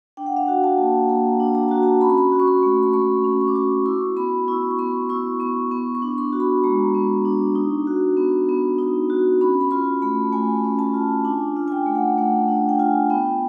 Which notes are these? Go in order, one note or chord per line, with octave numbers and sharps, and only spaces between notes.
D4 G5
F#5
F5
F#4 F#5
A5
A#3
A#3 A#5
D4
A#5
F#4 A5
A#5
C#4 B5
C6
B5
F#4
C#6
C6
A3
C6
A3 C#6
C#4
C#6
D6
F#4 C#6
E4 C6
B3 B5
E4 C#6
C#6
B3 C6
E4 C#6
B3 C#6
B3
C#6
D4
C6
F#4
B5
G#3 A#5
B3
D4
D#4
F#4
B3
B3
D#4
F#4
C#4 B5
B5
F4 C6
A3 B5
A3 G#5
C#4
A5
F4
D4 G#5
F4
G#5
G5
A3
F#5
A3 F#5
D4
G5
F4 G#5
B3 G5